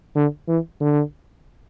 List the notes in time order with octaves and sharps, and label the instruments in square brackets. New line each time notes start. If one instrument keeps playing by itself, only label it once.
[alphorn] D3
E3
D3